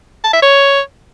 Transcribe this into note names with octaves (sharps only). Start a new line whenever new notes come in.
A5
E5
C#5